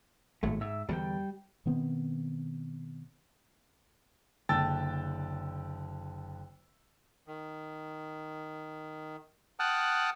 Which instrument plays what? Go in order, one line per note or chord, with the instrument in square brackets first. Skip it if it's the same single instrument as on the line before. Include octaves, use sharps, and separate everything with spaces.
[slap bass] G#1 A#2 F#3 [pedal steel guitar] A3
[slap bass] G#2 [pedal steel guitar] E5 E6
[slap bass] E2 D3 [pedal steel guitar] G3 G5
[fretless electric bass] B2 D#3 B3 C4
[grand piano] F#1 D3 G5 A5 E6 A6
[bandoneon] D#3
F#5 G5 A5 D#6 F6 F#6